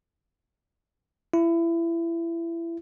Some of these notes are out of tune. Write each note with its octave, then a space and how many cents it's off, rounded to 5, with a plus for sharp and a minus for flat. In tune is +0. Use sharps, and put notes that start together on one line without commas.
E4 +25